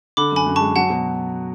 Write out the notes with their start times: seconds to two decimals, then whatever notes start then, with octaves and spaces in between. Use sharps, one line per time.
0.17 D3 B5 D6
0.32 F#2 G#5 B5
0.46 F#2
0.56 G#3 A5 C#6
0.76 F#3 F#5 A5
0.90 B2